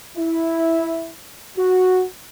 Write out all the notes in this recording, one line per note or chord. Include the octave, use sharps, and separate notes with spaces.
E4
F#4